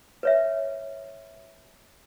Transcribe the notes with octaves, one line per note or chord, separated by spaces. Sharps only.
B4 C#5 E5